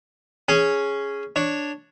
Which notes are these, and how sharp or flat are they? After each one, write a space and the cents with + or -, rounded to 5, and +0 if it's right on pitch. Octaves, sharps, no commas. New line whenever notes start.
C#4 +0 G#4 +0
D4 +0 C#5 +0